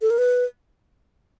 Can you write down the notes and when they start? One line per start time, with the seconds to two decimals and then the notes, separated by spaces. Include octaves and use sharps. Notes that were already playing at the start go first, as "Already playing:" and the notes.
0.01 A4
0.10 A#4
0.18 B4